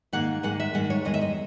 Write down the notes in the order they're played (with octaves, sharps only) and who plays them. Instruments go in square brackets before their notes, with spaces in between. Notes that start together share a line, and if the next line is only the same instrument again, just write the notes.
[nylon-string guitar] G#2 D#3 A#3 F#5
G#2 D#3 G#3 F#5
E5
G#2 D#3 G#3 F#5
C#5
E2 D#3 G#3 D#5
E5
D#5